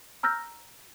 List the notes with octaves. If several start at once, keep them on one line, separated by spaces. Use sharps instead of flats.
A#5 E6 F6 G6 A#6